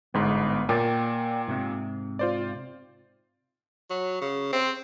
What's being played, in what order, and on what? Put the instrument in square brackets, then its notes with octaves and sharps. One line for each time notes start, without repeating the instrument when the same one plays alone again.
[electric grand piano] G1 G#2 [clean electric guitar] B3
[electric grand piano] A#2 A#3 [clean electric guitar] C#5 D5 G5
[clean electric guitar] G#2 C3
[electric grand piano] F4 C5 D5
[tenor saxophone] F#3
C#3
C4